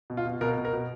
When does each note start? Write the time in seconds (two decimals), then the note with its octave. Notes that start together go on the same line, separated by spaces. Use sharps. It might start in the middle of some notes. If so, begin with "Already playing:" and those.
0.10 B2
0.17 F4
0.26 B2
0.41 B2 A#4
0.57 B2
0.65 A#4
0.73 B2